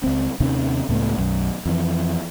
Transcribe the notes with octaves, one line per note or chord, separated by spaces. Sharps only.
C#2 C4
D#2 C3 D#3 C#4
C#2 A2 A3 B3
B1 F#2
F2 E3